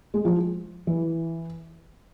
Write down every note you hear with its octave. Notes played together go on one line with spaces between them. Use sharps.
G#3
F3
E3